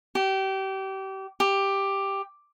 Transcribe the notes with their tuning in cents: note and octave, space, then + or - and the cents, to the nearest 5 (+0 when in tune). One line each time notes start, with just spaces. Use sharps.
G4 -30
G4 +5